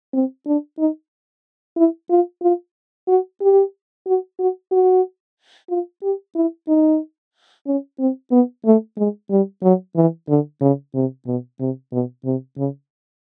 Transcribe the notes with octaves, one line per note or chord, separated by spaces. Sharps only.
C4
D4
D#4
E4
F4
F4
F#4
G4
F#4
F#4
F#4
F4
G4
E4
D#4
C#4
C4
B3
A3
G#3
G3
F#3
E3
D3
C#3
C3
B2
C3
B2
C3
C#3